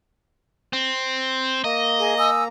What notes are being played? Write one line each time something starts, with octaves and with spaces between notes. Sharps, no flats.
C4
A#3 D#5 A#5
G#4
G#5 D#6 E6